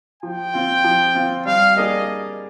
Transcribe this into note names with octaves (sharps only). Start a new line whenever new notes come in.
F3 G5
C4 F4
F3
C4 F4
G3 F5
A#3 D4 G#4 D5 D#5